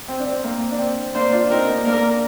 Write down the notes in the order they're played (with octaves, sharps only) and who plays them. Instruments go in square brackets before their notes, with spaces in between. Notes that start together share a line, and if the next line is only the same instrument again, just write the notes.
[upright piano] C4
D4
C4
A#3
D4
C4
[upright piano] A#3 D4 [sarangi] C5
[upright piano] D4 F4
[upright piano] C4 D#4 [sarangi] A#4
[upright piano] A#3 D4
[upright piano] A#3 D4 [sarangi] A#4